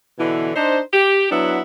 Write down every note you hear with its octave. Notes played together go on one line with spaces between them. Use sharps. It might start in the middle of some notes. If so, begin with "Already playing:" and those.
B2 D3 E3
D4 D#4 C5
G4
F#3 B3 D4 E4